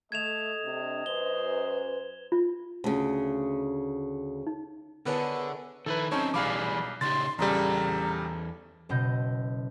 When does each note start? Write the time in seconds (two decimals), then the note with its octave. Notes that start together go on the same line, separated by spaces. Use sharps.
0.12 A3 A4 D#5 G#6 E7 F7
0.65 C3 D4
1.06 F#2 B4 C5 G7
2.32 F4
2.84 D2 C#3
4.47 D#4
5.06 D3 B3 E4 G#4 A#4 B4 C#5 A5
5.86 D#3 E4 A4 B4
6.12 F#3 C4 C#4 D#4 C#5 A5
6.34 B1 E3 G3 G#4 F5 B5 D6
7.01 C#3 D#4 G4 C6 A6
7.39 A#1 E2 C#3 G3 A4 A#5
8.89 F#1 B2 D#5 G6